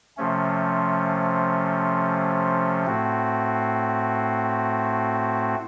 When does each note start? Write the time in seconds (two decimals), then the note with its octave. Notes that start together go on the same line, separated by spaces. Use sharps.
0.17 C3 F3 A3 C#4
2.86 A2 A3 C4 F#4